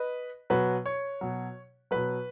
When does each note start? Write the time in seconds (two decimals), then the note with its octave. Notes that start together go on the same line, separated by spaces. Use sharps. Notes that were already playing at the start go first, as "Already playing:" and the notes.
Already playing: B4 D#5
0.50 B2 F#3 B4
0.86 C#5
1.21 B2 F#3
1.91 B2 F#3 B4